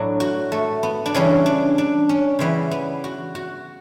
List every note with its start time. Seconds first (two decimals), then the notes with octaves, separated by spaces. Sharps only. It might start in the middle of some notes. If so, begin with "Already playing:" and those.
Already playing: A2 F#3 D4
0.20 F#4
0.52 A3
0.83 B3
1.06 D4
1.14 C#3 E3 G3 C#4
1.46 D4
1.78 D4
2.09 C#4
2.39 C#3 E3 G3 B3
2.71 B3
3.04 F#4
3.35 F#4